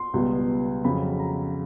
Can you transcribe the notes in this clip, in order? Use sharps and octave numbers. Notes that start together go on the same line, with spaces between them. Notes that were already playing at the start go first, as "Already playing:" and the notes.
Already playing: C6
C#2 B2 G3 B3
F2 C#3 F#3 B5
A#5